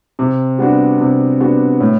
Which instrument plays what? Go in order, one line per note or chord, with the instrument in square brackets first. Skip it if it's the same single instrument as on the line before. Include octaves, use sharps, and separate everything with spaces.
[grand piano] C3
G3 B3 D4 F#4
C3
G3 B3 D4 F#4
A2